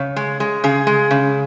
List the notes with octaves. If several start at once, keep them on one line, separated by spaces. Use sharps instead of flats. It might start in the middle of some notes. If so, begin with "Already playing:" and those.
Already playing: C#3 C#5
G#3
G#3
C#3 G#4
G#3
C#3